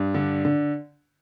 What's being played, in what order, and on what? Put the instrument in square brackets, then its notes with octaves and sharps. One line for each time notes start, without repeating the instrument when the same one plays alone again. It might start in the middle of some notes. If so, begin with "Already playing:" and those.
Already playing: [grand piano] G2
D3
D3